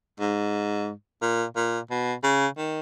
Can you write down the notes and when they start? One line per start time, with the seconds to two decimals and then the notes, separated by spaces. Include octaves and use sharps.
0.20 G#2
1.22 A#2
1.56 A#2
1.90 B2
2.24 C#3
2.58 D#3